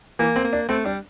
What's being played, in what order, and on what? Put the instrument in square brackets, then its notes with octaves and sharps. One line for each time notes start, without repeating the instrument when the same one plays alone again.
[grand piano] E3 [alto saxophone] A#3
[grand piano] C4
[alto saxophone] A#3
[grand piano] D4
[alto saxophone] A3 [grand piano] C4
[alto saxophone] G3 [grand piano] D4